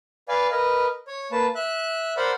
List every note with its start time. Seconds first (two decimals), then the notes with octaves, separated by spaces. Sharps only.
0.28 B4 D5 F5 G#5
0.52 A#4 B4 D#5
1.07 C#5
1.32 A#3 B4 A5
1.55 E5 F#6
2.17 A#4 C5 D5 F#5 B5